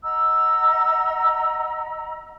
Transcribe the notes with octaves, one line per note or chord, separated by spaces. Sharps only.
D#5 F#5 A#5 E6